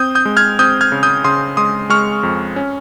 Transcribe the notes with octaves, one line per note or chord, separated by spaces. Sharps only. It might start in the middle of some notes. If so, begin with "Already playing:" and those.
Already playing: C4 D#6 G6
D#6 G6
G#3
F6 G#6
C4 D#6 G6
F6 G#6
C#3
D#6 G6
C#3 C6 D#6
G#3 C6 D#6
G#3 C#6 F6
F2
C#4